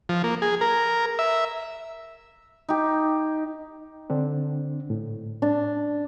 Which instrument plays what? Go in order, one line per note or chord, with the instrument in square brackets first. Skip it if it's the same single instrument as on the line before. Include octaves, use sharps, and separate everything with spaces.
[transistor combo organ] F3
A#3
G#4
A#4
E5
[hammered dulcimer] D#4 G4
[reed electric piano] D3 C4 D4
A2
[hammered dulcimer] D4